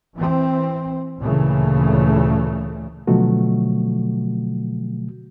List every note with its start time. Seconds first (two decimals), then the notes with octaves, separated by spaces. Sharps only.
0.15 E3 C4
1.19 D2 A#2 C#3 E3 A3
3.07 B2 D3 F3 F#3 A3 F#4